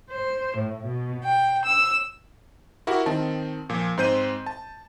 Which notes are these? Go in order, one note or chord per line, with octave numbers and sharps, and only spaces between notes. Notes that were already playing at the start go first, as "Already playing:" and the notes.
C5
A2
B2
G5
E6
E4 F#4 G4 A#4
D#3 C4 A5
A#2 F3
G#2 C4 C5 G6 D#7
A5